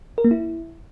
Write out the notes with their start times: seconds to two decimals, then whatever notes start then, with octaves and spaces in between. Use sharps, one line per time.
0.18 A#4
0.24 A#3
0.31 E4